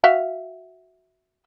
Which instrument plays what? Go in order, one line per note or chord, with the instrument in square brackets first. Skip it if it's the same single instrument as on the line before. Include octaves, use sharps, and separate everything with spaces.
[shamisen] F#4 E5 F5